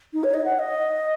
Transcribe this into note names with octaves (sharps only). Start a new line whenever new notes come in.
D#4
C#5
D#5
F#5
D#5